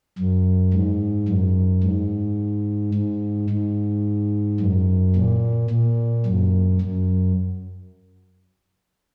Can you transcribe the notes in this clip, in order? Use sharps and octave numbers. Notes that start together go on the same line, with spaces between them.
F#2
G#2
F#2
G#2
G#2
G#2
F#2
A#2
A#2
F#2
F#2